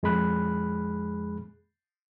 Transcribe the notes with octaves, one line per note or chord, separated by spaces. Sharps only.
F2 G#3 G#4 B5 F#6